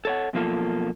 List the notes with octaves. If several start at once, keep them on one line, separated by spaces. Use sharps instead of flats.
A4 C#5 F#5
F#2 B2 F3 A#3 F4 A4